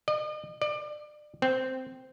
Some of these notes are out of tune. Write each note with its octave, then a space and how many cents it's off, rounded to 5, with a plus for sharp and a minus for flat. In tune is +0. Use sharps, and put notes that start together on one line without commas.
D#5 -45
D5 +30
C4 -10